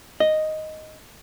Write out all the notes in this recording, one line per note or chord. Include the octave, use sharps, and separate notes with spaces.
D#5